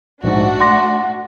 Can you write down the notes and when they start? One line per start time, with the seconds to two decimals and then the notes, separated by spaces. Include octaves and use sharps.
0.24 A#1 G#2 A3 D4 F#4
0.60 F#5 C6 D6 A#6